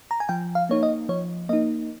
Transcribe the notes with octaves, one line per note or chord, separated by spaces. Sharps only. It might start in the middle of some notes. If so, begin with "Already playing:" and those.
A#5
G#5
F3 G5
F5
A#3 D#4 C#5
D#5
F3 C#5
A#3 D#4 D#5